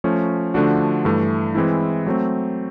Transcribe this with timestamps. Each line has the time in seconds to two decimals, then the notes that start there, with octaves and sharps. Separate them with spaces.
0.04 F3 A3 C#4
0.54 D3 F3 A3 D4 F#4
1.05 G2 E3 A3
1.55 E3 G#3 C4 E4
2.07 F#3 A3 C4